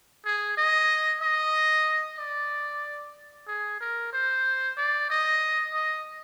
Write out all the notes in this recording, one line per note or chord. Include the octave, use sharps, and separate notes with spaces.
G#4
D#5
D#5
D5
G#4
A#4
C5
D5
D#5
D#5